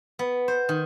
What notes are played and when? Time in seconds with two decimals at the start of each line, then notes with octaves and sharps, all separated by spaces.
0.19 B3
0.48 C5
0.69 D#3